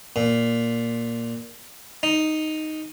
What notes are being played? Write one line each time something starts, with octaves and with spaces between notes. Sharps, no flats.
A#2
D#4